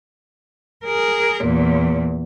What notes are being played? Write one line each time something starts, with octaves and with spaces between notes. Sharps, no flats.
G#4 A#4
E2 A#2